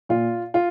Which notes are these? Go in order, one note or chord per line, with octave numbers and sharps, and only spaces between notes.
A#2 F4
F4